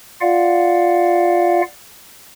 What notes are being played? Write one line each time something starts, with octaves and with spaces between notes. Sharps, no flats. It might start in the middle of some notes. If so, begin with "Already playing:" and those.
F4 D5 F5 F#5